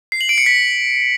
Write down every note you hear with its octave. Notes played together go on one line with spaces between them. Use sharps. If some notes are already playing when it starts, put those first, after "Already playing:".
C7
F#7
D7
C#7
B6